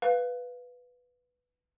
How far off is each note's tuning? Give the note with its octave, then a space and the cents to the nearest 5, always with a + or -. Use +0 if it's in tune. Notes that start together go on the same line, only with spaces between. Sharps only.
B4 +0 F5 +10